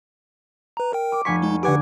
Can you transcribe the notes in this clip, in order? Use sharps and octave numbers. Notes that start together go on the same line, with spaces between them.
B4 A#5
A#4 G5
D6
F1 G#5 C#6 B6
G#3 D#4
D3 G4 B4 F#5 G#5 D6